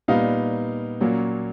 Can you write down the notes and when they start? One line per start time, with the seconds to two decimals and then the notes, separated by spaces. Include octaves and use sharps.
0.08 A#2 G3 B3 D#4 F5
1.01 A#2 F#3 A#3 C#4